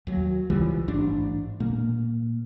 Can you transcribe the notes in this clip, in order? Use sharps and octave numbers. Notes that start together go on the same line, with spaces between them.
D#2 F#3
C#2 E3 F3 G3
A1 G#2 D4
A#2 A#3